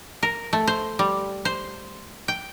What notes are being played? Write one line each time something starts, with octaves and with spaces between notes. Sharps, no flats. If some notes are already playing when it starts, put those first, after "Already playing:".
A#4
A3
C5
G3
C5
G5